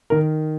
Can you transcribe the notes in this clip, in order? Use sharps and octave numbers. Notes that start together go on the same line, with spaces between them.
D#3 A#4